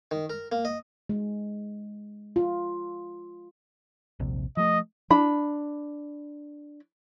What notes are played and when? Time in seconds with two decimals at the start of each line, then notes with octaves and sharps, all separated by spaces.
0.11 D#3
0.30 A#4
0.52 A#3
0.65 D#5
1.09 G#3
2.36 F4
4.19 D#1 A#1 C3
4.57 F3 A3 D#5
5.10 D4 B5